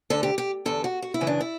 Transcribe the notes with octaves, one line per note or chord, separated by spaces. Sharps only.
D2 D3 A4
G4
G4
E2 D3 A4
F#4
F#4
E4
F#2 C#3 E3
D4
E4